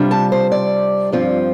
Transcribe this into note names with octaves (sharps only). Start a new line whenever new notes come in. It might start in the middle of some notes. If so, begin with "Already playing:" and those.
Already playing: C3 G3 D4 F4
A5
C5
D5
G2 F3 C4 F4